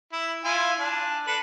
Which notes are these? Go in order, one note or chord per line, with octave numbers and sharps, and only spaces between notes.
E4
E4 F4 G#5
D4
D4 A4 B4